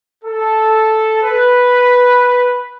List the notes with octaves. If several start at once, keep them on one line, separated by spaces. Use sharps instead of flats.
A4
B4